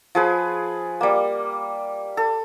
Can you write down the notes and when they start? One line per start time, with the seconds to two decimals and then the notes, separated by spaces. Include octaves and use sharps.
0.15 F3 G#4 B4
1.01 G3 A#3
2.17 A4